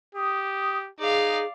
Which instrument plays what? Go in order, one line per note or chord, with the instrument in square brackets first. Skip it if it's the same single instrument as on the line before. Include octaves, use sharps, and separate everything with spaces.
[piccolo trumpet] G4 [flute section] D#6
[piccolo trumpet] D#4 [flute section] G#4 [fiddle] D5 F5